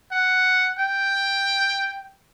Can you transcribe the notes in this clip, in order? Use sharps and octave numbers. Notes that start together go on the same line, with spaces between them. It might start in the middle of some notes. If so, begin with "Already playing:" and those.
F#5
G5